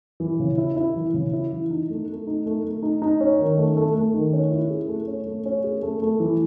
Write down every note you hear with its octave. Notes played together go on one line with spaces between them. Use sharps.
E3
C#3
E4
E4
E3
C#3
E4
E3
D#4
A3
A3
D#4
A3
A3
D#4
D#4
C#4
D#3
A3
A3
A3
D#3
C#4
E4
G#4
A3
C#4
A3
C#4
G#4
A3
A3
E3